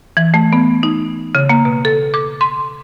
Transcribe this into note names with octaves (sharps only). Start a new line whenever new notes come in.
E3
A3
B3
D#4
C#3
A#3
B2
A4
D6
C6